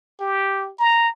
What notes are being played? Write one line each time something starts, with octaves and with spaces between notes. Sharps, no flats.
G4
A#5